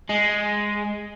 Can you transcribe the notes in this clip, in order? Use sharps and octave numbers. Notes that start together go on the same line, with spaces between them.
G#3